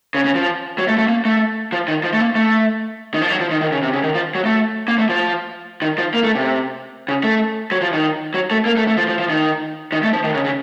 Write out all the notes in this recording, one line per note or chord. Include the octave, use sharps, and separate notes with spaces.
C#3
C#3
F3
F#3
A3
A3
A#3
A3
F3
D#3
F3
A3
A#3
A3
D#3
F3
F#3
F3
D#3
D#3
C#3
C3
C#3
D#3
F3
F#3
A3
A#3
A3
F3
D#3
F3
A#3
A3
C3
C#3
A3
F#3
F3
D#3
F#3
A3
A#3
A3
A3
F3
F3
F3
D#3
D#3
A3
F3
D#3
C#3
C#3